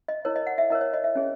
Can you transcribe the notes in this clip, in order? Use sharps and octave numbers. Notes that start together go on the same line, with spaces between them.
D#5
E4 A#4 C#5
D#5
F#5
E5
E4 A#4 C#5 D#5
C#5
D#5
E5
C#4 G#4 C#5